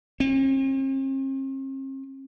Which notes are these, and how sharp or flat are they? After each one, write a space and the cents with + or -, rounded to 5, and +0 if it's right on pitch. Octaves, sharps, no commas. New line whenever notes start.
C4 +45